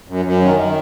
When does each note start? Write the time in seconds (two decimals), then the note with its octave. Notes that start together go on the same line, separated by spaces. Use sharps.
0.08 F#2
0.25 F#2
0.42 D#3
0.59 D#3